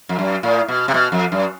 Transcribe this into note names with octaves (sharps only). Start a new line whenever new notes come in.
F2
F#2
A2
B2
C3
B2
F2
F#2